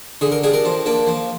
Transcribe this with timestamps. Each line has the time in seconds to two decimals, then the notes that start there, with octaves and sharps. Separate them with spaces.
0.21 D3 G#4
0.32 A#4
0.44 G3 D4 G#4
0.53 A#4
0.65 F3
0.86 A#3 D4
1.07 F3